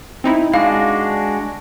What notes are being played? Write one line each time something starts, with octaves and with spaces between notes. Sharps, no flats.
C4 D#4 E4
G#3 D4 F#4 F5